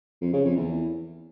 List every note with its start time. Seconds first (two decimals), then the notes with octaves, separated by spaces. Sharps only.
0.22 F2
0.33 C#3
0.45 F2
0.56 E2